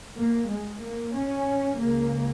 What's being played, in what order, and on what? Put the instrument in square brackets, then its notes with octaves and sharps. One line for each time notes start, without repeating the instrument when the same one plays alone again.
[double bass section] A#3
G#3
A#3
C#4
C#2 C#3 A#3